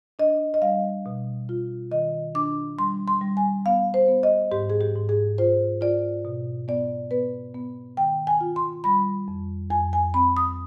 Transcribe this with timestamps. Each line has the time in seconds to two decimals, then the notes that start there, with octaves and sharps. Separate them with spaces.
0.19 D4 D#5
0.54 D#5
0.62 G3 F5
1.06 B2
1.49 F4
1.92 D#3 D#5
2.35 D4 D6
2.79 G3 C6
3.08 C6
3.21 G3
3.37 G#5
3.66 B3 F5
3.94 C5
4.08 B3
4.23 D#5
4.52 G#2 G4
4.70 G#4
4.81 G4
4.95 G#2
5.09 G#4
5.38 F4 C5
5.81 F4 D5
6.25 B2
6.68 B3 D5
7.11 B3 B4
7.54 B3
7.97 D#3 G5
8.27 G#5
8.41 F4
8.56 C6
8.84 G3 B5
9.28 F2
9.70 F2 G#5
9.93 G#5
10.14 C4 B5
10.37 D#6